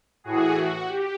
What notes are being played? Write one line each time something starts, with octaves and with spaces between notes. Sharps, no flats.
A2 E3 F#4 G#4
F#4
G4